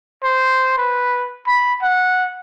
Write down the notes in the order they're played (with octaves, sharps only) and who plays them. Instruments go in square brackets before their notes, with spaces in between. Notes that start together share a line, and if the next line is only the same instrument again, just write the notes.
[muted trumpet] C5
B4
B5
F#5